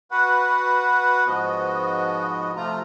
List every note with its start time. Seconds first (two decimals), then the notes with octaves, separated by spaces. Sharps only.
0.11 F#4 B4 F#5
1.27 G#2 F3 B3 F#4 D#5
2.56 C3 F3 A3 F4 A#5